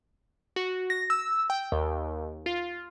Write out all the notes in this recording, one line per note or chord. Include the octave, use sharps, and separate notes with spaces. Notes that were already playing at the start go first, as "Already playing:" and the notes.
F#4
A#6
E6
G5
D#2
F4